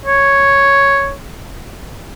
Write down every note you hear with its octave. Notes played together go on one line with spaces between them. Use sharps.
C#5